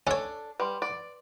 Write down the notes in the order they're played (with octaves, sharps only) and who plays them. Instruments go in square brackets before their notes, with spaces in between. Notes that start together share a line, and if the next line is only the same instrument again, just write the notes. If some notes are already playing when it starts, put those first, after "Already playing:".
[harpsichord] C#4 C#5 [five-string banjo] D4 A4
[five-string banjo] G3 [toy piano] B4 C6
[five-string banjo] D5